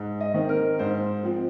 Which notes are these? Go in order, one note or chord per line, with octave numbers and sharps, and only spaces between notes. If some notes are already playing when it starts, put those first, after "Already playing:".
Already playing: G#2
D#5
D#3 C4
A#4
G#2 C5
F3 C4